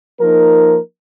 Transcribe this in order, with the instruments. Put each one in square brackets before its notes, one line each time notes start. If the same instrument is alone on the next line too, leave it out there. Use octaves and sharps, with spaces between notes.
[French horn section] F3 A#3 D#4 A#4